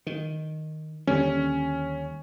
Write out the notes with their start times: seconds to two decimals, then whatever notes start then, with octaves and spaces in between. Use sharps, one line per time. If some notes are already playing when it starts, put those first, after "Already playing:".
0.07 D#3
1.07 D#2 D3 G3 C#4